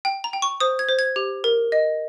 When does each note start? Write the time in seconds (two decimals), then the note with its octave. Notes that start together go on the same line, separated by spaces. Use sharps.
0.05 G5
0.24 A#5
0.33 G5
0.42 C#6
0.60 C5 D#6
0.79 G#6
0.88 C5
0.99 G#6
1.16 G4
1.44 A#4
1.72 D#5